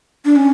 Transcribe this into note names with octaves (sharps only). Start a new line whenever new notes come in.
D4
C#4